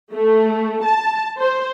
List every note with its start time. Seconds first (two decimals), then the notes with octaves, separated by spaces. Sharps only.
0.13 A3
0.84 A5
1.40 C5